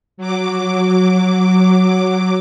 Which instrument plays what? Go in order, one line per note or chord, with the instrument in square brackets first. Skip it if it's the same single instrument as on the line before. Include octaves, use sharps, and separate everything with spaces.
[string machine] F#3 D6